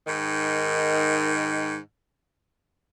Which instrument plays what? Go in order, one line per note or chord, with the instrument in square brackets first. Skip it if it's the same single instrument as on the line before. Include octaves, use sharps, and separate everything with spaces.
[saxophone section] G#2 D#3